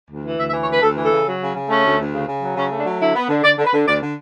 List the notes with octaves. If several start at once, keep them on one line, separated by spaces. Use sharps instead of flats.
D2
E3
D2 E5
E5
E3
C#5
D2 B4
D2 A4
E3
A4
C#3
F#3
C#3
C#3
A3 C#4
D2
D2
C#3
C#3
F#3
C#3 C#4
A3
D4
F#3
D3 E4
B3
D3
D3 D5
D3
B4
D3
D2 D5
D3